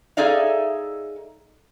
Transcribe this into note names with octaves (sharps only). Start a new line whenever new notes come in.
D#4 G#4 A4 D5 E5 F5